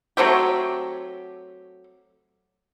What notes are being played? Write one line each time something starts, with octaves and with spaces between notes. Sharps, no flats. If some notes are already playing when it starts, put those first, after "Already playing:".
F#3 A3 C4 G4